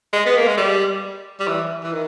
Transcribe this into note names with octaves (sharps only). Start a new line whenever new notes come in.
G#3
B3
A#3
G#3
G3
G3
E3
E3
D#3